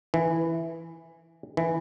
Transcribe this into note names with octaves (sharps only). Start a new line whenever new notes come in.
E3
E3